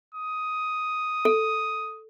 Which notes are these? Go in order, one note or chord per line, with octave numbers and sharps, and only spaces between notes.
D#6
A4